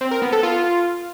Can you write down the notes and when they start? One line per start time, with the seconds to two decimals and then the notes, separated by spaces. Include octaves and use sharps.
0.01 C4
0.11 A#4
0.22 B3
0.33 A4
0.43 F4